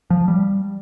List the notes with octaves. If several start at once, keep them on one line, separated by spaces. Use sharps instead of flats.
F3
G3